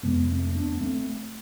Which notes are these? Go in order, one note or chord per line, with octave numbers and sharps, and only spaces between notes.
F2 C3 G#3 B3
A3 C4
C4
B3 D4
B3
A3 C4